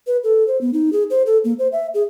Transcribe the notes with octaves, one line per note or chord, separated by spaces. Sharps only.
B4
A4
C5
B3
D#4
G#4
C5
A4
A#3
C5
E5
G#4